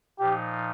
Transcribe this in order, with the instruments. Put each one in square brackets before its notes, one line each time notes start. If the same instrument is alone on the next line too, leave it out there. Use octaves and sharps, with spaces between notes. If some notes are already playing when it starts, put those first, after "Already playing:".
[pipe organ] A#2 F3 D#4 [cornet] G4